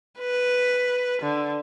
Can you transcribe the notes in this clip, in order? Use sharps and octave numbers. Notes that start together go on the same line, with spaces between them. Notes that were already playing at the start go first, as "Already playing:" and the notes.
B4
D3